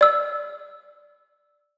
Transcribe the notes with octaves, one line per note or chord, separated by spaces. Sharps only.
D5 E6